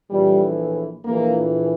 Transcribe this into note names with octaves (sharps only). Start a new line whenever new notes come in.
A#1 A2 E3 G3
A#1 A2 E3 A#3